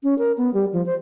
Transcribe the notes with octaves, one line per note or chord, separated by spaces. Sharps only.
C#4
A#4
B3
G3
F3
C5